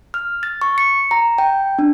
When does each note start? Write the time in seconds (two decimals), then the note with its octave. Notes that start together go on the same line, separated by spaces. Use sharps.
0.14 F6
0.43 A6
0.62 C#6
0.78 C#7
1.11 A#5
1.38 G5
1.79 D4